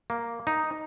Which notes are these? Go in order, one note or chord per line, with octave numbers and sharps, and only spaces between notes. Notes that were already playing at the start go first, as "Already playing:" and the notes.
A#3
D#4